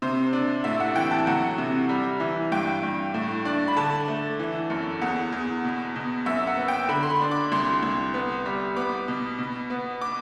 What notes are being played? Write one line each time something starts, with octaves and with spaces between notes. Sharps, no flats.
C3 C5
D4
A2 E5
F#5
E3 G5
A5
F#3 F#5
C3
G3
E3
G2 G5
G2
A2
D4
B5
D3 A5
A3
E3
F#2
E2 F#5
E2
B2
B2
F#2 E5
F#5
B3
G5
D3 B5
C6
B5
D4
D6
C2 C6
C2
B3
G3
B3 D6
B2
B2
B3
D6